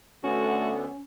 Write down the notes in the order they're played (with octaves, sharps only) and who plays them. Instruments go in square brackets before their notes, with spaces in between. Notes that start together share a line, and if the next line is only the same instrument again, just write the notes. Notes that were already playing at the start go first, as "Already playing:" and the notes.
[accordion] D2 D3 B3 [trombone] A3 [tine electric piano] C#4 [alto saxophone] F#4